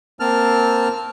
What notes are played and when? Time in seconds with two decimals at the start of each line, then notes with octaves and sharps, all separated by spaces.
0.20 A#3 C4 A5 F6